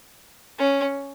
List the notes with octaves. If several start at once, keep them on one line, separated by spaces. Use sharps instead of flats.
C#4